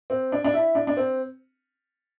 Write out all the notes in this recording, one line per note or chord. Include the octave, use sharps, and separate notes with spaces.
C4
D4
D4
E4
D4
D4
C4